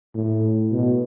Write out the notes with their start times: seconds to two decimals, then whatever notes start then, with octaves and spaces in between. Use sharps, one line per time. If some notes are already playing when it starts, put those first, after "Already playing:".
0.15 A2
0.72 B2